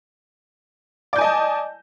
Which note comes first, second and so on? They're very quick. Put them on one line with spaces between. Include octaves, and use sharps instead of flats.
D5 G6 G#5 D#5 A5